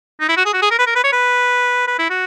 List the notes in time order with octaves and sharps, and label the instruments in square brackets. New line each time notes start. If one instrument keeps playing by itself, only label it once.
[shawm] D#4
E4
F#4
G#4
F#4
G#4
A#4
B4
A#4
B4
C#5
B4
B4
E4
F#4